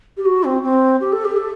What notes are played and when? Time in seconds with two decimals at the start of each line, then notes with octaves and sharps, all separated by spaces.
0.17 G4
0.25 F#4
0.44 C4
0.63 C4
1.01 G4
1.12 A4
1.25 G4
1.37 A4